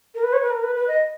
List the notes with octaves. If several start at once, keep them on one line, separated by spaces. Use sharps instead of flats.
A#4
B4
C#5
B4
A#4
B4
B4
D#5